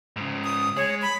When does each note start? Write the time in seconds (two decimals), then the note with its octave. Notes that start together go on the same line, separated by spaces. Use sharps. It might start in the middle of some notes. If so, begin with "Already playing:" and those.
0.16 G#2 C#3
0.44 D#6
0.77 G#3 C#5
1.02 B5